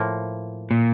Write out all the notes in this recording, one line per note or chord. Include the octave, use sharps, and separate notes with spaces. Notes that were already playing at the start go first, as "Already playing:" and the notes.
Already playing: A2 F3 A#3
A#2